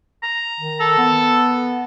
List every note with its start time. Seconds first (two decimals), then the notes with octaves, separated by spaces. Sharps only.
0.23 A#5
0.60 D#3
0.80 A4
0.98 B3